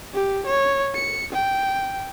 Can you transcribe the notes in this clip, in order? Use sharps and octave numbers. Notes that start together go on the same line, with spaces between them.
G4
C#5
C#7
G5